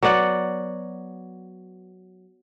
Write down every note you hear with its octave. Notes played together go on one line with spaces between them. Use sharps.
F#3 B3 D5 F#5